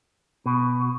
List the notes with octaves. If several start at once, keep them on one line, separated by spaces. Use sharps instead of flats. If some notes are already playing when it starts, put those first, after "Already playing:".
B2